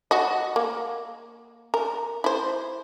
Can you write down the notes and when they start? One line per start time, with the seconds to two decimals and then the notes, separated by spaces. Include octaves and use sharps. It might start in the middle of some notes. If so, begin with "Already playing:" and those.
0.11 F#4 D#5
0.56 A#3
1.74 A#4
2.24 E4 C5